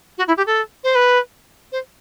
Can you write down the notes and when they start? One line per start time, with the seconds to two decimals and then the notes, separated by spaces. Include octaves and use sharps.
0.18 F#4
0.28 E4
0.37 G4
0.47 A4
0.84 C5
0.95 B4
1.72 C5